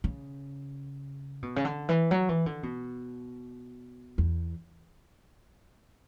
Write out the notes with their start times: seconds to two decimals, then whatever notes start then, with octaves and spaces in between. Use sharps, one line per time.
0.04 C#3
1.43 B2
1.56 C#3
1.65 D3
1.89 E3
2.11 F#3
2.29 E3
2.46 D3
2.63 B2
4.18 E2